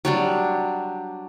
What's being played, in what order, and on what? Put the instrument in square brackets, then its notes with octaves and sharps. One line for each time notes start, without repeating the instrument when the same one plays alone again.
[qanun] F#3 G3 D4